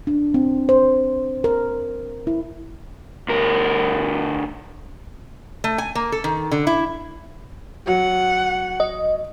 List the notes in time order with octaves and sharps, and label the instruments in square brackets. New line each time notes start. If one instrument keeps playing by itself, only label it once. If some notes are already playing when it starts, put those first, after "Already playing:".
[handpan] D4
C4
C5
A#4
E4
[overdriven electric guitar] D2 A#4
[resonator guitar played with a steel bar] A3
G#5
A#3
A4
D#3
D3
E4
[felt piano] F#3 [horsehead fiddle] F#5
[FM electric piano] D#5